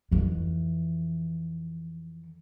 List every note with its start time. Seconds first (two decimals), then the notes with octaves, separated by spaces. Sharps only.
0.11 F2 E3